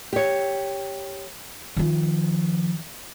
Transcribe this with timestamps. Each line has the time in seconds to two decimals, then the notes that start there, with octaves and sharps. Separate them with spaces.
0.13 G4 C#5
1.77 D#3 F3